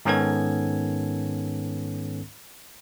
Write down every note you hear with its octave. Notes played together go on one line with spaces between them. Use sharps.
G#2 D#3 B3 C#4 A4 G#6